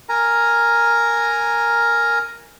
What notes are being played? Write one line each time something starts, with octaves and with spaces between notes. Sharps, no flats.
A#4 G#5 A#5